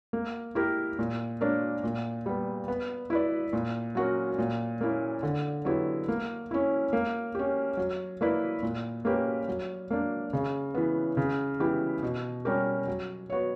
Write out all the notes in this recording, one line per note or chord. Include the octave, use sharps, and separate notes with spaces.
A#3
E4 G4 A#4
A#2
A#3 D4 A#4 C#5
A#2
G3 B3
B3
E4 B4 D5
A#2
F#3 C#4 F#4 A#4
A#2
A#3 C#4 E4
D3
F#3 B3 E4 G4
A#3
C#4 E4
A#3
C#4 G4
F#3
A#3 E4 B4 D5
A#2
A#3 C#4 G4 B4
F#3
A#3 D4
C#3
E3 B3
C#3
E3 B3 E4 G4
B2
G3 C#4 G4 A#4
F#3
B3 F#4 C#5